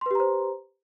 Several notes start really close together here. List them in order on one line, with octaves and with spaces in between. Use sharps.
C6 B4 G4 A#5 C5